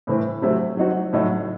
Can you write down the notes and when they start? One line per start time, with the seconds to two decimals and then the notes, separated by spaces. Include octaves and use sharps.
0.07 A2 E3 C4
0.42 C3 F#3 A3 C4
0.77 F#3 C4 D#4 F#4
1.13 A2 F#3 A3 D#4 F#4